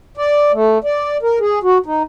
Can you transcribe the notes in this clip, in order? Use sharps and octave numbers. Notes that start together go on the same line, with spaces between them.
D5
A3
D5
A#4
G#4
F#4
D#4